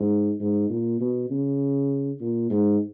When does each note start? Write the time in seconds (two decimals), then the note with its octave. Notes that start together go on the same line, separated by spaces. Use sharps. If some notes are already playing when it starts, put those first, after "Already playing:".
Already playing: G#2
0.40 G#2
0.69 A#2
1.00 B2
1.30 C#3
2.20 A#2
2.50 G#2